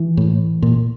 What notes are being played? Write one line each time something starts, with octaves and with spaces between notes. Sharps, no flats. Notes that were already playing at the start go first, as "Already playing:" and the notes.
Already playing: E3
A2
A#2